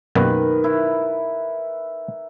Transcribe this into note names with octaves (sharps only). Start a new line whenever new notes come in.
F#2 B2 D#3 A#3 B4
E4